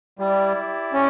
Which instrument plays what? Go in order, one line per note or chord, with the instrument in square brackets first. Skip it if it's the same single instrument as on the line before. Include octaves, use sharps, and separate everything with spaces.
[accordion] G3 [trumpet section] E4 G4 D5
[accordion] C#4